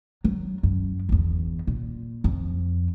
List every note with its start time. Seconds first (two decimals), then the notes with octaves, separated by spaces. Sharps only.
0.24 F#3
0.63 F#2
1.09 G1 E2
1.67 A#2
2.24 F2